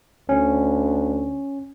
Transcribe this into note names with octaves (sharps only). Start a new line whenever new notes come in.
D2 C#4